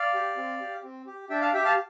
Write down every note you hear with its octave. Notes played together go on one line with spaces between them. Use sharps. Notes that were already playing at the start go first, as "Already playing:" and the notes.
Already playing: D5 F5
G4
C4
G4
C4
G4
D4 E5 G5
F5 A5
G4 E5 G5
F5 A5